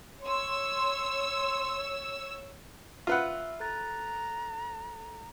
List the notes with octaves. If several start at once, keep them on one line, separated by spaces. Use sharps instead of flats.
C#5 C6 E6
F4 B4 E5 F#5 E6
A4 A#5 F#6 A6